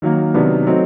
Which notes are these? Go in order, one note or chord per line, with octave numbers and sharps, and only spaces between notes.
D#3 F#3 A#3
C3 D#3 F#3 B3 D4
F#3 A3 C4 D#4